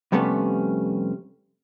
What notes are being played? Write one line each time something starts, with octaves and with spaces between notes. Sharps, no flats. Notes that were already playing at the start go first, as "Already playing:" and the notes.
F2 C3 G3 A3 B3 C#4